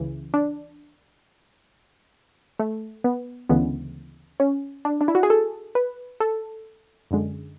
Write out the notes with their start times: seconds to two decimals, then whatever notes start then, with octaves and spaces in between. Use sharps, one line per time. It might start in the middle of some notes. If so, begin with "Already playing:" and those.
Already playing: C#2 C#3 E3
0.34 D4
2.59 A3
3.04 B3
3.49 D2 C#3 E3 G#3 B3
4.40 C#4
4.85 D4
5.01 D4
5.08 E4
5.15 F#4
5.23 G#4
5.30 A4
5.75 B4
6.20 A4
7.11 F#2 D3 G#3